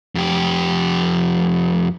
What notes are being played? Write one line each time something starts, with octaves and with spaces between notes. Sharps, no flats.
F2 G4